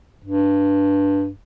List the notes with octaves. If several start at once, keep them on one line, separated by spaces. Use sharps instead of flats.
G2